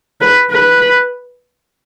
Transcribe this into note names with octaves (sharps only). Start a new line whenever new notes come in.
B4
B4